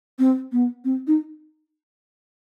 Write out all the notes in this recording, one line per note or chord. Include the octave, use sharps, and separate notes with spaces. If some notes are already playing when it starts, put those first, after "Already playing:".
C4
B3
C4
D#4